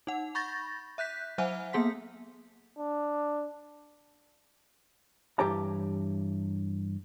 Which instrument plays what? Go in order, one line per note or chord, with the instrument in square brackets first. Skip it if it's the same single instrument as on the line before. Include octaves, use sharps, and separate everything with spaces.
[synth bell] D#4 F#5
B5 C#6 G6 A6 A#6
E5 F#6 G6 B6
F#3 C5 E5 F#5 G#5 F6
A#3 B3 G#4 C6 B6
[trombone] D4
[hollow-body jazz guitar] G2 E3 G4 C#5 A5 A#5